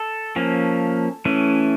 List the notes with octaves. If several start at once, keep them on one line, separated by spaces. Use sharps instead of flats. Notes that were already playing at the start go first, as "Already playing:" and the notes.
Already playing: A4
F3 A#3 C#4
E3 A3 C#4